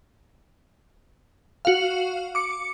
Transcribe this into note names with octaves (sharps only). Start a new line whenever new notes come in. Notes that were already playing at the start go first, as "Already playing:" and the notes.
F#4 F5
D6 C#7